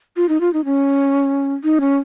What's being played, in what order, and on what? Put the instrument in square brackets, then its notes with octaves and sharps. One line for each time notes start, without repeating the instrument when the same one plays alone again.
[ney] F4
D#4
F4
D#4
C#4
D#4
C#4